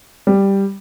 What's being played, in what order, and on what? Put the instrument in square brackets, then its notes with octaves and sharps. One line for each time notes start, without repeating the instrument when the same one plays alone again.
[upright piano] G3